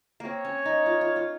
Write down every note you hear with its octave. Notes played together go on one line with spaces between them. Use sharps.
A#3 C4 C#5
C#4
D#4
F4
F4
F4